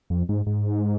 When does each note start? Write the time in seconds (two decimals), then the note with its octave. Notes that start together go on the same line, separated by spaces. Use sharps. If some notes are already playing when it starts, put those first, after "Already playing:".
0.10 F2
0.29 G#2
0.46 G#2